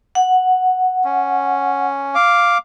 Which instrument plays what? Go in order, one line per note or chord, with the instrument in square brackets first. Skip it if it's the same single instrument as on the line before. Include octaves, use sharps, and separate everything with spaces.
[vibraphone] F#5
[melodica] C#4
F5 D6